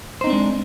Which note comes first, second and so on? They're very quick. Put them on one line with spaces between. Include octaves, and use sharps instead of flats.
C5 D#4 C4 D4 G#3